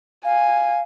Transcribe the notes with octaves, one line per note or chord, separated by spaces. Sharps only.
F5 G#5